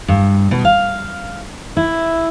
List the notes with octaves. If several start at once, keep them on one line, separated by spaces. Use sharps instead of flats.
G2
B2
F5
E4